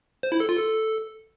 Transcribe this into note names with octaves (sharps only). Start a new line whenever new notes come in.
C5
E4
A4
F4
A4